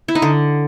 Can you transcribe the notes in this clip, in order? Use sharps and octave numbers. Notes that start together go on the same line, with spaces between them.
E4
D#4
D3